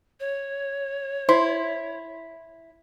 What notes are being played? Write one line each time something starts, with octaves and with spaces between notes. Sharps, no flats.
C#5
E4 C5 C6